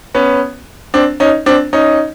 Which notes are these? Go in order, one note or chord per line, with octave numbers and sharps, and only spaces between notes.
B3 C#4
C4 D4
C#4 D#4
C4 D4
C#4 D#4